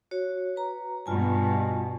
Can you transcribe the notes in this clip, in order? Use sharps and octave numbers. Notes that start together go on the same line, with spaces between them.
F#4 C#5
B4 A#5
G2 B2 F4 G#5 A5